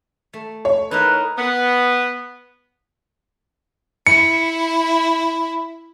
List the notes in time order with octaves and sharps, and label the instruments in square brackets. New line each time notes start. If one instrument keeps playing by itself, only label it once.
[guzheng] A3
[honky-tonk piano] C#5
[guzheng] D#4 E4 A#4 [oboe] B4
[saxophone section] B3
[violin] E4 [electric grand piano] C#7